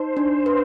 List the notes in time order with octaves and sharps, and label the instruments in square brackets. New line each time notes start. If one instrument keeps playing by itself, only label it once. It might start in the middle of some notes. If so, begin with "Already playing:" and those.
Already playing: [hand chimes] D#4 [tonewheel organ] C5
[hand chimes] D4
B4